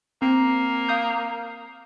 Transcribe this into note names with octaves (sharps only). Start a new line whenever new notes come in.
A#3 C4
F5 D#6 G6